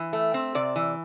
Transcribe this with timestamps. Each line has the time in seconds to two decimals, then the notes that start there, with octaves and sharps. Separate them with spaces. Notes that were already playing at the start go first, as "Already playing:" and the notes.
Already playing: E3
0.13 A3
0.34 C4
0.55 C3 D5
0.76 E3